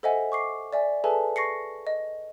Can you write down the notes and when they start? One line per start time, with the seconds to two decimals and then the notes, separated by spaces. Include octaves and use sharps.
0.03 A4 C5 D#5 E5 F#5 G#5
0.32 C#6 D6 C7
0.73 D5 E5 G#5
1.04 G#4 A4 B4 E5 G#5 A5
1.36 C#6 A#6 C7 C#7
1.87 D#5